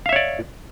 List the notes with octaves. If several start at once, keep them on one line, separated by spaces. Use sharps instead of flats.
C#5 D5 E5 F5